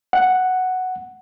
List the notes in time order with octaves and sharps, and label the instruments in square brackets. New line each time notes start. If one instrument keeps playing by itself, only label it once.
[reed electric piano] F#5